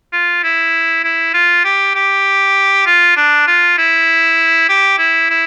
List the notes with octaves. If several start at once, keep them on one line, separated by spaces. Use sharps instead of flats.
F4
E4
E4
F4
G4
G4
F4
D4
F4
E4
G4
E4
E4